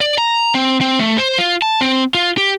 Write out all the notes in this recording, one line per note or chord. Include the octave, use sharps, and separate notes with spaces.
D5
A#5
C4
C4
A3
C5
F4
A5
C4
F4
G4